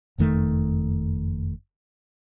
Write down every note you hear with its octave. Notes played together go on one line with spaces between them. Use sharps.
F#1 F2 D#3 A3